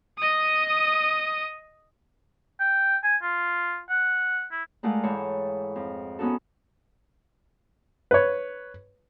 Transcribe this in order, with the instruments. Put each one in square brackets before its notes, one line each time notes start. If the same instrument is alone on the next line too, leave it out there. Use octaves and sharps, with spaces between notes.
[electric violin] D#5 D#6
[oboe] G5
G#5
F4
F#5
E4
[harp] G#3 A3 F4 A#4 D5 F#5
G#2 E3 G#4 A4 C#5 G5
F2
B3 C#4 D#4 F#4 A4
[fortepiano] B4 C#5